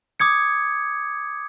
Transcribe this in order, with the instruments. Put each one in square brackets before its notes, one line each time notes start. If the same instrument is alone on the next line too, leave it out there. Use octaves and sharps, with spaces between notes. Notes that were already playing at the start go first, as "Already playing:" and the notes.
[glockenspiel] D6 D#6 G#6 C#7